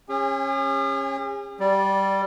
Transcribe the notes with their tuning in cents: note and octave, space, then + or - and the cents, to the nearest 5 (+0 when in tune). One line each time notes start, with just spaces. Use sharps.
C#4 -20 G#4 -45
G3 -10 D5 +0